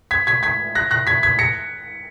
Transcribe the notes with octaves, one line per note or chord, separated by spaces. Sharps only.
G#6 B6
G#6 B6
G#6 B6
F#6 A#6
F#6 A#6
G#6 B6
G#6 B6
A#6 C#7